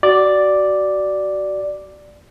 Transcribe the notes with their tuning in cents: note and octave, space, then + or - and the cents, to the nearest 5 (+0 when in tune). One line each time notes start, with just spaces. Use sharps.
F#4 +25 D5 +0